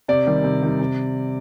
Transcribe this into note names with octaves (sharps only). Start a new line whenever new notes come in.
C3 D5
D#3 G3
C3
D#3 G3
C3